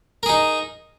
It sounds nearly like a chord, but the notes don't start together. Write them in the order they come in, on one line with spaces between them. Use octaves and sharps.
A#4 G#4 D#4